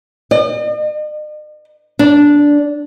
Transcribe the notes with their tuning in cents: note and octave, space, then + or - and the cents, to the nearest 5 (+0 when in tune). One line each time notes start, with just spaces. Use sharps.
D#5 -45
D4 -10